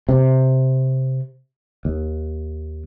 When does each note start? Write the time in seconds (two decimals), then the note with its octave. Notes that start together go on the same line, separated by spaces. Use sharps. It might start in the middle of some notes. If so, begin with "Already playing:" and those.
0.09 C3
1.85 D#2